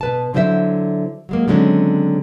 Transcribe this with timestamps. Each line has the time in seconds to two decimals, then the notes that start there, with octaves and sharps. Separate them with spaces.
0.01 B2 B4 A5
0.34 D3 F#3 E4 C5 D#5 E5
1.29 F#3 G#3 A#3
1.48 D3 D#3 F#3 G#3 C4 C#4